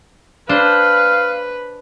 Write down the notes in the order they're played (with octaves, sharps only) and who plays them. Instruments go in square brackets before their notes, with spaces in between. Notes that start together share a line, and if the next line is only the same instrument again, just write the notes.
[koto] D4 C5 [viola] B4 [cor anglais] F5